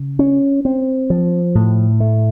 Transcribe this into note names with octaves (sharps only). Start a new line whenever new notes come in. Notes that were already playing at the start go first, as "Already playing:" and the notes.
Already playing: C#3
C#4
C4
F3
A2
A3